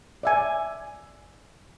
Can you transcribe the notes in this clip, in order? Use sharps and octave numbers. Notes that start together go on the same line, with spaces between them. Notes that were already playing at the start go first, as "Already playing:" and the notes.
D5 E5 G#5